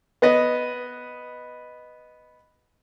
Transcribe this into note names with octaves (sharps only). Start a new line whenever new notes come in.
B3 B4 D#5